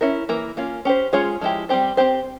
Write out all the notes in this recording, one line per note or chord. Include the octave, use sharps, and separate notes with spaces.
C#4 E4 A#4
E3 A#3 E4 A#4
A#3 C#4 F4
C#4 G4 C5
G#3 C#4 F4 G#4 C#5
F3 G#3 E4 G4
G3 C4 G4 C5
C4 G4 C5